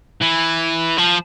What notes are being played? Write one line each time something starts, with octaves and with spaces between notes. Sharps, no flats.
E3
F3